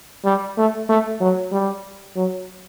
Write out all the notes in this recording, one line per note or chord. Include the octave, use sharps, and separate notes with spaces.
G3
A3
A3
F#3
G3
F#3